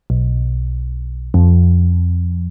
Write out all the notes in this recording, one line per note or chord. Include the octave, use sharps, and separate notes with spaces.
B1
F2